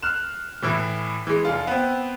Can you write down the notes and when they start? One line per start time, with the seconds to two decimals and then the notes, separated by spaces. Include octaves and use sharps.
0.03 F6 F#6 E7
0.62 A2 E3 E4
1.27 E3 G#3
1.45 F1 F4
1.67 B3 C4